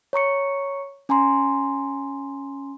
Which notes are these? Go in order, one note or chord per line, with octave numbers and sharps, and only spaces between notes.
C#5 A#5 C#6 C#7
C#4 G#5 A#5 C6